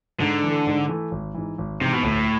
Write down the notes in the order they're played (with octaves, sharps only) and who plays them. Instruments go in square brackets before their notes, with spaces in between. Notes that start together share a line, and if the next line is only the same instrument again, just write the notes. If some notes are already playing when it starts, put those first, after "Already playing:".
[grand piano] G#2 [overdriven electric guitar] D3
[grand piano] E3 A3
G#2
E3 A3
G#1
G#2 E3
G#1
[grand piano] G#2 E3 [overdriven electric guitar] C3
[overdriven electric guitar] B2
[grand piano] D2 [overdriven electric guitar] A2